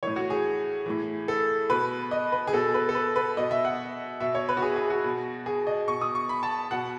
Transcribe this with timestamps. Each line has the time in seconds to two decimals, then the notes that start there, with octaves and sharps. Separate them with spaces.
0.03 A2 E3 C#5
0.16 F#4
0.30 G#4
0.86 A2 E3
1.28 A4
1.70 B2 B4
2.11 D#5
2.32 B4
2.47 G#4
2.53 B2 A4
2.74 B4
2.89 A4
2.95 B4
3.16 B4
3.37 B2 D#5
3.51 E5
3.65 F#5
4.20 B2 E5
4.35 C#5
4.49 B4
4.57 F#4
4.62 G#4
4.76 G#4
4.90 F#4
5.04 B2
5.46 G#4
5.67 D#5
5.88 B2 C#6
6.01 D#6
6.15 C#6
6.29 B5
6.43 A5
6.71 B2 F#5